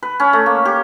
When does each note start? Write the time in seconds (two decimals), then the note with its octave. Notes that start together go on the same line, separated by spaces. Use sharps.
0.03 B4
0.20 C#4
0.33 A3
0.46 A#3
0.65 G4